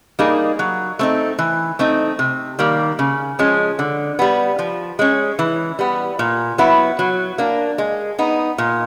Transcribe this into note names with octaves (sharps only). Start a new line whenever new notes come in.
G3 A#3 D#4 G#4
F#3
A3 C4 D#4
E3
A3 C4 D#4
C3
D#3 G3 A#3
C#3
F3 G#3 C#4
D3
G3 B3
F3
G#3 C#4
E3
G3 B3
A#2
F#3 B3 E4
F#3
A#3 D4
G#3
B3 D#4
A#2